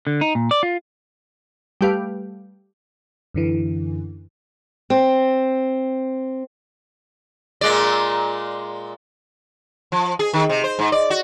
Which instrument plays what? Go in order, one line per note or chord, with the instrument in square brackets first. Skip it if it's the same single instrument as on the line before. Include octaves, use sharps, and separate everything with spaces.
[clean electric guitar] D3
D#4
A#2
D5
F4
[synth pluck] G3 A3 G4 B4 F5
[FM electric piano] F#2 D3 E3
[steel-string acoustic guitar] C4
[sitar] A#2 G#3 D5
F3
G#4
D#3
C3
C5
G#2
D5
F#4